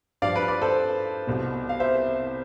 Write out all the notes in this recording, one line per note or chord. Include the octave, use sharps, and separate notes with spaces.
G2 F3 D5 F5
B4 D5
B4 D5
A4 C5
C2 B2
F5
C5 E5